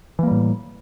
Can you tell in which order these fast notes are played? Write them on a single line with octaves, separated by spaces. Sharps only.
E3 A#3 G3 A2